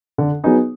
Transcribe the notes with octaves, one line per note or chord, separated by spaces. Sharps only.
D3
F#3 B3 D#4 G#4